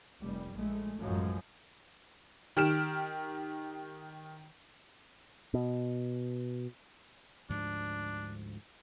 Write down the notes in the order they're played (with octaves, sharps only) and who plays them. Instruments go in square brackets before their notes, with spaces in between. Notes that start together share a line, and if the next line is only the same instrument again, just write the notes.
[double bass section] F1 G3
A#1 G#3 A3
A1 F#2 F3 F#3 G#3
[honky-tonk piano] D#3 G4 F6 D7 E7
[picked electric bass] B2
[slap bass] D2 G#2 F3 [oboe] D4